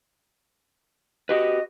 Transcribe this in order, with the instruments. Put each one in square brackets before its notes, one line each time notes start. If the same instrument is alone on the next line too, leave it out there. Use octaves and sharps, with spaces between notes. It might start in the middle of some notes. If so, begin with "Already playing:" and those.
[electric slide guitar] F#4 G4 B4 [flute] D#5